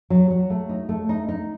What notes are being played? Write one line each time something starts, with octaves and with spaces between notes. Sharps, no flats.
F#3
F#3
A3
D#4
A3
D#4
D#4